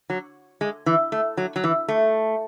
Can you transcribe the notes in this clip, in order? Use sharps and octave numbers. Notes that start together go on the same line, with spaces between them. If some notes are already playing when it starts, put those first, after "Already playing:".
F#3
G#3
E3
A3
F#3
F#3
E3
A3